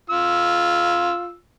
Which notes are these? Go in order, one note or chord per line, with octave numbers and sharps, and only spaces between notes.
F4 E6